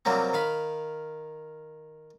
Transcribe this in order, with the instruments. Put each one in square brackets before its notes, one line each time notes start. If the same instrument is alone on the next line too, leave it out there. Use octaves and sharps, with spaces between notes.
[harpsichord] C3 F#3 G3 A#3 C4
D#3 F5 B5